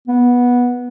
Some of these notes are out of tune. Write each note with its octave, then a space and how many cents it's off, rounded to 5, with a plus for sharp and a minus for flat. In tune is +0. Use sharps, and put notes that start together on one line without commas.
B3 -15